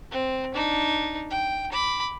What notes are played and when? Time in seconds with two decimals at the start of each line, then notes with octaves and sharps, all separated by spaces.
0.11 C4
0.55 D4 D#4
1.30 G5
1.72 B5 D6